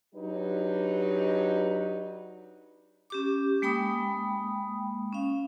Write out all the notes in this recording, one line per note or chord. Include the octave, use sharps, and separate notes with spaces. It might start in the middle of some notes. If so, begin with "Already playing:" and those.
F#3 D4 D#4 G4 B4
C#4 G4 D6
G#3 A#3 G5 B5 D#6
C#4 F5